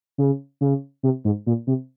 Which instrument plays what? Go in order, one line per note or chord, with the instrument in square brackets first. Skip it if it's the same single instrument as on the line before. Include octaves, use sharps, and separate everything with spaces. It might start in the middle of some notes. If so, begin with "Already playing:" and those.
[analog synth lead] C#3
C#3
C3
G#2
A#2
C3